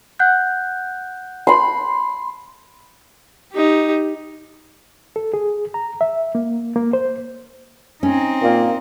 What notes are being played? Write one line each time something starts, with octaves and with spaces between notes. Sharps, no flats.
F#5 F#6 G6
B5 C6
D#4 G4
A4
G#4
A#5
E5
A#3
A#3
C5
C4 C#4 D#4
A#2 A#3